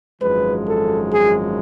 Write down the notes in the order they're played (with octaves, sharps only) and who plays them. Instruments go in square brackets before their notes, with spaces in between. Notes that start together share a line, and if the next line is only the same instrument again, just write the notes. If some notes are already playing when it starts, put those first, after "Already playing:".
[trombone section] G#1 F#2 F3 G#3 B4
A4
G#4